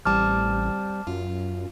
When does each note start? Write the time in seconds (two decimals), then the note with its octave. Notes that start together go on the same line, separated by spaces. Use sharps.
0.05 A1 G3 C4 A5 D6 F6
1.07 F#2 F4